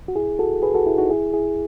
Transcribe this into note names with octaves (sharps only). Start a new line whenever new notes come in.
F#4
E4 G#4
F#4 A4
G#4 B4
F#4 A4
E4 G#4
D#4 F#4
E4 G#4
E4 G#4